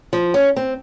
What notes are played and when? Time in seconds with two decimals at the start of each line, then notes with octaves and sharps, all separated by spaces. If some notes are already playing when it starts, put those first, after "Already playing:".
0.13 F3
0.34 C#4
0.56 C4